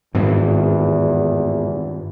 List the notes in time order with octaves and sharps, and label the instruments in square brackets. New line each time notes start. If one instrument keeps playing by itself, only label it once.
[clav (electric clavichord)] G#1 [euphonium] E2 [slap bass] G2 D#3 E3